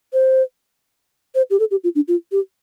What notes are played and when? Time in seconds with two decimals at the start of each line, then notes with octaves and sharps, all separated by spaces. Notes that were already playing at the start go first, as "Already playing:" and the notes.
0.13 C5
1.35 C5
1.50 G4
1.60 A4
1.71 G4
1.84 F4
1.95 D4
2.08 F4
2.32 G4